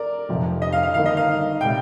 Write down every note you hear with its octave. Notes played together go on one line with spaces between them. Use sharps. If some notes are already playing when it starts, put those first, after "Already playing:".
Already playing: A#4 D5
F1 F2 C3 F3
D#5
F5
F5
G1 G2 D#3 A#3 F5
D#5
F5
C3 G3 G5